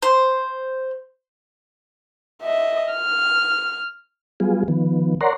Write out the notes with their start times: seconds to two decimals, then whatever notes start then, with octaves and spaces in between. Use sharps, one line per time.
0.03 C5
2.43 D#5 E5
2.93 F6
4.40 F#3 G3 B3 F4 G#4
4.68 D#3 F3 B3
5.21 A#4 C#5 D5 F#5 A#5 C6